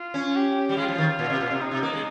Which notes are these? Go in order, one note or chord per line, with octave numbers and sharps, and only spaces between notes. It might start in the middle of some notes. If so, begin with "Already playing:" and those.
Already playing: F4
C#4
G4
G3
G#3 F4
F3
D#3
A#2
C3
A#2
C3
C3 D#4
C3
A#3
G#3